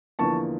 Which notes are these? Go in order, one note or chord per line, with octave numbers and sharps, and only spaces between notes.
E2 D3 F3 A#3 A5 C#6